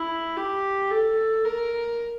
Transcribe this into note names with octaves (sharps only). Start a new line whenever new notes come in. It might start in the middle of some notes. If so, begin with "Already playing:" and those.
Already playing: E4
G4
A4
A#4